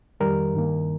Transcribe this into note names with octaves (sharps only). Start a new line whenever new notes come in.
F2 D#3 G3 A#4
G2 D#3 A#3